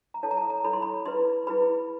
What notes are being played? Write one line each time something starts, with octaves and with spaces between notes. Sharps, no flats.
A#5
E4 A4 C#5 A5
A#5
A5
A#5
E4 A4 C#5 B5
C6
B5
E4 G#4 B4 C6
E4 G#4 B4 B5